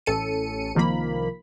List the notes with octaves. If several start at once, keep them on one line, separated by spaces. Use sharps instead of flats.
A1 C#4 A4 C#7 D#7
C2 D#3 F3 A#3 B5